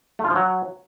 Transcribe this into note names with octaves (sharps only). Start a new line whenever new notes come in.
A3
F4
F3
F#3